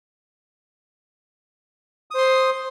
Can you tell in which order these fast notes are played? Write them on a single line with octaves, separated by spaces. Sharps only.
D#6 C5 C6